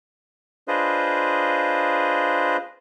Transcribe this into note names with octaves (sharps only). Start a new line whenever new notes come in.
D4 F4 G#4 B4 C5 D#5